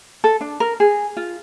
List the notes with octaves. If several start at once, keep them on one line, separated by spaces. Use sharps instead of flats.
A4
D4
A#4
G#4
F4